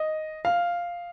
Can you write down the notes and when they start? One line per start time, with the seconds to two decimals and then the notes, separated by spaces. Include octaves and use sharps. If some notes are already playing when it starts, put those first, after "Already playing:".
Already playing: D#5
0.45 F5